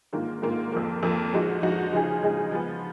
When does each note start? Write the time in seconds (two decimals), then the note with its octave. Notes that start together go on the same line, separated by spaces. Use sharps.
0.13 G#2 D#3 A#3 F4
0.42 G#2 D#3 A#3 F4
0.72 F2 F3 A#3
1.03 F2 F3 A#3
1.33 F3 G#3 D#4 F#4
1.62 F3 G#3 D#4 F#4
1.93 C#3 F3 G#3 D#4 G#4
2.22 C#3 F3 G#3 D#4 G#4
2.52 F3 G#3 B3